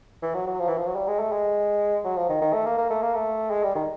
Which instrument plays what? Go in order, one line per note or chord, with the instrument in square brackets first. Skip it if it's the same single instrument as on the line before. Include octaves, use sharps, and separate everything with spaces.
[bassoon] E3
F#3
F#3
F3
E3
F3
F#3
G3
G#3
A3
G#3
F#3
F3
D#3
D#3
A3
A#3
A#3
A3
A#3
A3
G#3
G3
D#3